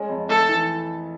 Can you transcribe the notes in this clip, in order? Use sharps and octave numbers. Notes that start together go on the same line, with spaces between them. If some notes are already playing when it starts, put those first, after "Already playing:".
Already playing: G#3 C#4
F2
A3 A4
E3